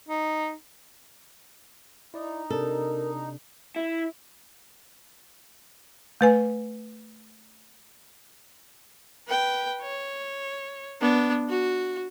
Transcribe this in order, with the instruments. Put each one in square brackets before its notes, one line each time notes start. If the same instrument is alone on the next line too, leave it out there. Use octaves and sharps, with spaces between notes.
[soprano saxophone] D#4
[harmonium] D#4 [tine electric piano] E4 D5
[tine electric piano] C3 D4 [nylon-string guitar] A4 [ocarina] A#4
[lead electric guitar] E4
[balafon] A3 B4 G#5
[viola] B4 G5
C#5
B3 D4
F#4